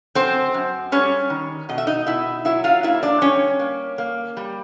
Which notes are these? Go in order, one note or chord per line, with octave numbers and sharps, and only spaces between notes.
F#2 C4 C5
F#2
G3 C#4 C#5
D#3
B2 D#5
E5
D#4 D#5
B2 E4 E5
F#3 E4 E5
F4 F5
A#3 E4 E5
D4 D5
G3 C#4 C#5
A#3
A#3
G3